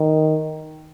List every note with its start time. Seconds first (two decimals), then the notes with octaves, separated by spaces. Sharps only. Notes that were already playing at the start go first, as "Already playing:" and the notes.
Already playing: D#3